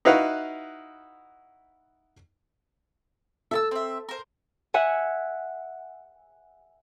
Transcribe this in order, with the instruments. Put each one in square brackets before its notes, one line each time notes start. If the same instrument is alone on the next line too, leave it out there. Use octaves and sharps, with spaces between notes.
[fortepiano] D#4 E4 F#4 B4 F5 F#5
[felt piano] A4 [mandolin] E5 A5 E6
[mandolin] C4 E5
A#4 C5
[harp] E5 F#5 G#5